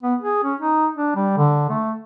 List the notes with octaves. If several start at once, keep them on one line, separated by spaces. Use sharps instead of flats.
B3
G#4
C#4
D#4
D4
G3
D3
A3